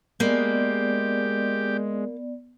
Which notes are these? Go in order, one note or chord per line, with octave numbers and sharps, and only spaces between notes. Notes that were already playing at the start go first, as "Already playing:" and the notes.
G#3 A#3 B3 G4 D5